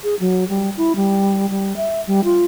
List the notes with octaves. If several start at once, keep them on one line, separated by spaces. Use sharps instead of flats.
G#4
F#3
G3
E4
G3
G3
E5
G3
F4